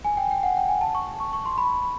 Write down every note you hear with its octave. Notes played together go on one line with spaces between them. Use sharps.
G#5
G5
G5
F#5
G5
G#5
A5
C#6
C#6
C#6
C6
B5